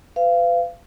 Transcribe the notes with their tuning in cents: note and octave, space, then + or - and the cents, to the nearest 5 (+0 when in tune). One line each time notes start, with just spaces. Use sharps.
B4 +40 F5 -25